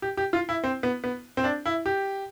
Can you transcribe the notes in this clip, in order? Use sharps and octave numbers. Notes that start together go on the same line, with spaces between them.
G4
G4
F4
E4
C4
B3
B3
C4
D4
E4
G4